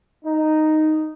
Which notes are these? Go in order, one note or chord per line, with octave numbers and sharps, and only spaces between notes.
D#4